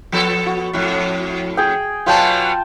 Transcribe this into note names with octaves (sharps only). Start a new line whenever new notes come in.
F3 B3 A4
F#4
F2 A2
G#4 G5
B2 F#3 B3 F4 G5 A5